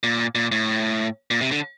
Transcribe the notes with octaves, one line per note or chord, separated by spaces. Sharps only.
A#2
A#2
A2
A#2
C3
D3